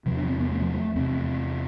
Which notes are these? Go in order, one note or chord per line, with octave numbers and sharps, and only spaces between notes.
E2 C3 F3
D4
C4
B3
A3
F3
A3
E2 C3 C4